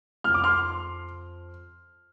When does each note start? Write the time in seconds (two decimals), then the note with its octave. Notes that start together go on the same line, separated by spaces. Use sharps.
0.24 F2 F3 F6
0.34 D6
0.44 C6 F6